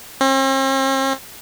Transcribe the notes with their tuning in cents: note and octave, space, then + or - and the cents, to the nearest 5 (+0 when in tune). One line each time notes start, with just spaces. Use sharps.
C4 +45